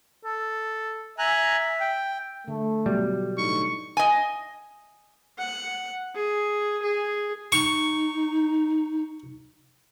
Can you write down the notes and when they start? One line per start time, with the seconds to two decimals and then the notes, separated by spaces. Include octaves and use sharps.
0.25 A4
1.19 E5 G#5 A#5 F#6
1.80 G5
2.48 D3 A3
2.86 B2 F#3 G3
3.38 A2 D3 D#4 C#6
3.97 D#5 G#5
5.38 F#5
6.15 G#4
6.82 G#4
7.52 D#4 C#6